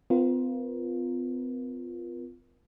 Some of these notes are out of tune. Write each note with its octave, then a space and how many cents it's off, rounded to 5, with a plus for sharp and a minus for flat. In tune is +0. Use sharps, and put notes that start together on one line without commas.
C4 -45 F4 +0 A#4 +30